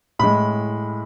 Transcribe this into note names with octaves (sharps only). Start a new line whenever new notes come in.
A2 G#3 B5